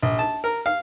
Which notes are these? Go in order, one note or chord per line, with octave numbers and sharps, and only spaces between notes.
A#1
A5
A#4
F5